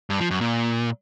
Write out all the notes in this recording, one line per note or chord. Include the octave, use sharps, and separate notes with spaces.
G2
F3
F#2
A#2